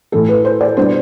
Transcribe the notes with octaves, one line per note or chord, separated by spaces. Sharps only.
A2 E3 A3 A4
B4
C5
D5
B2 G3 B3 D4 C5